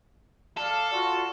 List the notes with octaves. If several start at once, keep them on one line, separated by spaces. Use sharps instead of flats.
A4 D5 F5
F4 F#4